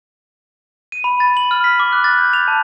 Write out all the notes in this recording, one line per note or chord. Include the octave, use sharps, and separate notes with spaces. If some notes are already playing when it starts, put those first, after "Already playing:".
D#7
B5
A6
F#7
F6
B6
D6
F#6
A6
G6
F7
A5